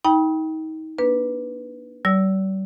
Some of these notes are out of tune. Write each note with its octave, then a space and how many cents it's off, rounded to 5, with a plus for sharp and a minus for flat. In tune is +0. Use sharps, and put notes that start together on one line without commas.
D#4 +30 G5 +0 B5 -25
A#3 +40 D4 +0 B4 +0
G3 -35 D5 -40 E6 +0